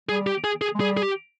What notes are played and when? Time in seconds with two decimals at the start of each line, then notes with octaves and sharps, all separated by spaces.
0.09 G3 G#4
0.27 G4
0.44 G#4
0.62 G#4
0.75 G#3
0.79 G3 G#4
0.97 G#4
1.03 G4